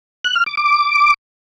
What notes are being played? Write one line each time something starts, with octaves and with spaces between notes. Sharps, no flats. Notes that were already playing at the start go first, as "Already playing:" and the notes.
F#6
F6
D6
D6